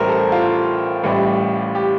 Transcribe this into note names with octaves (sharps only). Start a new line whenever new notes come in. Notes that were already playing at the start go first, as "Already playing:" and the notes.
Already playing: A1 A2 G3 A#4 C5
A4
F4
A1 A2 G3
G4